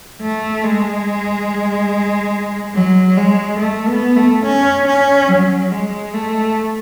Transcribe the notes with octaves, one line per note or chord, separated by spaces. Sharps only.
A3
G#3
F#3
G#3
A3
B3
A3
C#4
C#4
F#3
G#3
A3